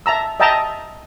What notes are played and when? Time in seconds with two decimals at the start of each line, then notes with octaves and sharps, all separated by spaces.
0.06 E5 A5 A#5 E6
0.40 D#5 E5 G5 A5 A#5